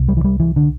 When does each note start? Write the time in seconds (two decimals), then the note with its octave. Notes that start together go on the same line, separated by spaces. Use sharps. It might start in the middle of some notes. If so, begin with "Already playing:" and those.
Already playing: C2 C3
0.08 G3
0.17 E3
0.24 G3
0.40 E3
0.56 D3